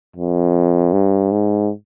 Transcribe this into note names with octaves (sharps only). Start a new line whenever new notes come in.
F2
G2
G#2